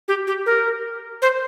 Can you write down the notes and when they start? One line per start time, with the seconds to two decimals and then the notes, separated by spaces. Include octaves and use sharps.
0.08 G4
0.27 G4
0.46 A#4
1.22 C5